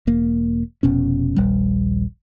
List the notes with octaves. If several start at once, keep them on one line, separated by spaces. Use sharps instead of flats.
E1 A#3
F1 B2 C#4
D#1 A#1 G3